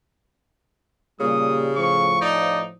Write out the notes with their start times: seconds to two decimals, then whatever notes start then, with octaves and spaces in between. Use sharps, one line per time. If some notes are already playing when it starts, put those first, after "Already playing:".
1.20 A#2 C#3 G3 D#6
1.76 A2 F3 C#6
2.21 D#4 D5